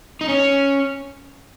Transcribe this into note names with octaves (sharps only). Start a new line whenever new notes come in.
D#4
C#4